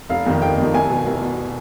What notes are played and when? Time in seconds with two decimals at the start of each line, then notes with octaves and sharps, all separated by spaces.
0.10 F1 F5
0.27 F2 D#3
0.42 F1 G5
0.58 F2 D#3
0.74 C2 G#5
0.89 B2
1.06 C2
1.22 B2